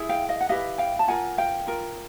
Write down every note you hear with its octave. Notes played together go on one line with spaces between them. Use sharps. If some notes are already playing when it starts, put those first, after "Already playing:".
Already playing: E4 G#4
F5 G5
D#5 F5
F#5
E4 G4 B4 D#5 F5
F5 G5
A5
F4 A#4 F#5 G#5
F5 G5
F4 A#4